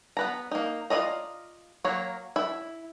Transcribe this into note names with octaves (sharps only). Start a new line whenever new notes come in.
B3 B4 A#5
A#3 D#4
F4 A#4 D5 D#5 A#5
F#3 A#3 C#5 A#5
E4 E5